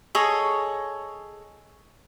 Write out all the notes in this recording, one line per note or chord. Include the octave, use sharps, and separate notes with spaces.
G#4 A4 C#5 D#5